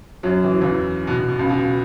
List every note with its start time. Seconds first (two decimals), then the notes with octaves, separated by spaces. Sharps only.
0.23 F#2 F#3
0.44 E3
0.53 F#3
0.61 E2 E3
1.07 B2
1.18 B2
1.28 B2
1.39 C#2 C#3
1.49 B2